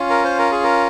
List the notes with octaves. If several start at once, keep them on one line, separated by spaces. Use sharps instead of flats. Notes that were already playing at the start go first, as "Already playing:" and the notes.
Already playing: C#4 F4
A#4
C5
A#4
G#4
A#4